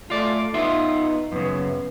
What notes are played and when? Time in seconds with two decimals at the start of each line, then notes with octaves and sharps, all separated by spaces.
0.10 A3 F4 D5
0.54 B3 D#4 F4 E5
1.32 F#2 C#3 B3